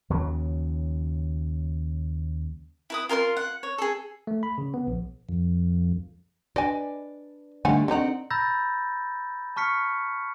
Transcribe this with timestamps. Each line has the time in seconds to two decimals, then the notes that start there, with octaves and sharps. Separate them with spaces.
0.10 D#2 C#3 F#3
2.90 E4 B4 D#6
3.09 F4 A#4 G#5 C6
3.37 F#5
3.63 C#5
3.78 G#4 A4
4.27 A3
4.43 B5
4.58 C#3
4.74 B3
4.87 A#1
5.29 F2
6.56 D4 B4 D5 D#5 G#5
7.65 D3 D#3 G3 A3 F#5 G#5
7.88 D3 D#3 C4 D#4 F#5
8.30 A#5 B5 E6 G6 A6 A#6
9.56 A5 C#6 F6 B6 C#7